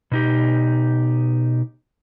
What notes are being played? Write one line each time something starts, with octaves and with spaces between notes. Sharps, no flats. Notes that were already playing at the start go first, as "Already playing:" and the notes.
B2 D#4 G4